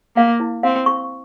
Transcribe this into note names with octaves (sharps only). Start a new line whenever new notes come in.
A#3 F5
E4
C4 F5
C#6